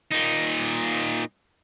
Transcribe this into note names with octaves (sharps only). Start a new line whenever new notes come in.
A#2 D#4